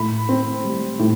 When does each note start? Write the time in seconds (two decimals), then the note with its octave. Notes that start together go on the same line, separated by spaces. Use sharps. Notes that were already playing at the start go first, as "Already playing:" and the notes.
Already playing: A2 B5
0.29 C4
0.64 G3
0.99 A2